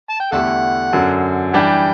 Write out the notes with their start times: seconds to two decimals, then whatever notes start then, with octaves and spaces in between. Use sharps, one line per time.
0.09 A5
0.20 G5
0.32 E2 D3 A3 E4 G4 A4 F#5
0.93 F#2 D3 F#3
1.53 E3 G3 D4 G4 G5